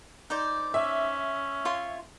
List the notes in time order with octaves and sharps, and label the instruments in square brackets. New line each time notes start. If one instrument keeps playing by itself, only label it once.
[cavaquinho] D#4 C5 D5
[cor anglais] C#4 [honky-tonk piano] E5
[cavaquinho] F4 C#5 C6